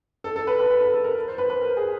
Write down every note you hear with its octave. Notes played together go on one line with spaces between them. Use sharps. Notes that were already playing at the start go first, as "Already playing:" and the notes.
A4
A4
B4
B4
B4
A4
A4
A#4
C5
B4
B4
A#4
G#4